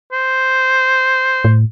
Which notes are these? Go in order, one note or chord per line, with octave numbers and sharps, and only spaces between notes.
C5
A2